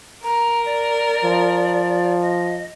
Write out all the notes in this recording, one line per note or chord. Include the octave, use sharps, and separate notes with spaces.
A#4 A#5
D5
F3
D#5